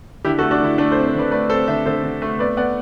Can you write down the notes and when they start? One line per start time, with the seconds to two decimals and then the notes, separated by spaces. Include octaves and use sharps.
0.25 D3 E4 G4
0.38 F#4 A4
0.43 A3
0.51 D4 F#4
0.60 D3 E4
0.78 A3 D4
0.92 A4 C5
0.97 C4
1.07 C5
1.14 D3 B4 D5
1.31 A3 B4 D5
1.49 C4 A4 C5
1.67 D3 C5 E5
1.86 D3 A4 C5
2.03 D3
2.22 A3
2.39 B3 B4 D5
2.57 B3 D5 F#5